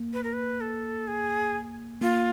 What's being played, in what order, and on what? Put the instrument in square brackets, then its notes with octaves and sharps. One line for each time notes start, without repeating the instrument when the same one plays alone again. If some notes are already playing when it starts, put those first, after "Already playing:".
Already playing: [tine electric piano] A#3
[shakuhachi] B4
A#4
B4
A4
G#4
[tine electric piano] A#3 [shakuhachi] F4